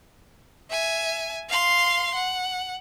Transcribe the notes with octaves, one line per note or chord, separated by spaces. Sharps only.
E5 G#5
F5 C6
F#5